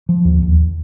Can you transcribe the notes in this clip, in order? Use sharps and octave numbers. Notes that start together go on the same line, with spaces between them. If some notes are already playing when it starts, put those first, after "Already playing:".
F3
D#2
D#2